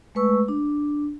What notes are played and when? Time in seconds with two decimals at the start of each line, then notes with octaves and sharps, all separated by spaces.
0.15 G#3 A3 B4 C#6 E6
0.48 D4